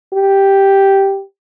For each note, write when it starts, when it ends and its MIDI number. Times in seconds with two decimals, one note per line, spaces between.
0.13 1.22 67